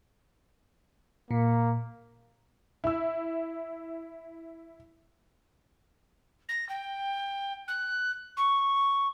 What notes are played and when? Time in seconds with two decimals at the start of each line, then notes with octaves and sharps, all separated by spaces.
1.31 A#2 A#3
2.84 E4 E6
6.49 A#6
6.69 G5
7.68 F#6
8.37 C#6